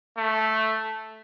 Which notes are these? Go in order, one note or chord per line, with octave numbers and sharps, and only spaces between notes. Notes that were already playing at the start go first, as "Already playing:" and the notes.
A3